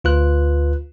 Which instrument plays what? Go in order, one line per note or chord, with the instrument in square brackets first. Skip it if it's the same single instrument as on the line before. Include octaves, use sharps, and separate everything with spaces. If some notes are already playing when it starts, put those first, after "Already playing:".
[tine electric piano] D2 F4 B4 F#6